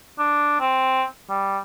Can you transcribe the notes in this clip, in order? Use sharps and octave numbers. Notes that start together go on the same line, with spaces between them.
D4
C4
G3